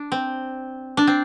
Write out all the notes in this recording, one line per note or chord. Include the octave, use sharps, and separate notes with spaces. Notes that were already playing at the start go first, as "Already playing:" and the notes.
Already playing: D4
C4
D4
C4